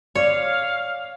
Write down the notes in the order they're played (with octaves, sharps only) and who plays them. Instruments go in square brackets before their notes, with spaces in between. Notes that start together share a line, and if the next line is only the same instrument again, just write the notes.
[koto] C#5 [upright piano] D5 [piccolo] F5